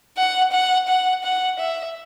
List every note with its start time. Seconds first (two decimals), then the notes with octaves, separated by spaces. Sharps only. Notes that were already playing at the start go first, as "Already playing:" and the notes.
0.17 F#5
0.52 F#5
0.88 F#5
1.24 F#5
1.59 E5